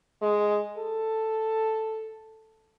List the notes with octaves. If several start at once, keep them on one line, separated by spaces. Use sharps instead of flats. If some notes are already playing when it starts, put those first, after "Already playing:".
G#3
A4